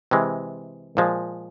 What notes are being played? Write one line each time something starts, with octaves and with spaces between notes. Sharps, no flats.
C3 E3 G#3
A#2 F3 G#3